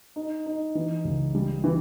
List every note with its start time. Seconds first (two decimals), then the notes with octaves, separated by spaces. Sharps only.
0.16 D#4
0.46 D#4
0.75 E3
1.04 C#2
1.35 G3
1.64 E3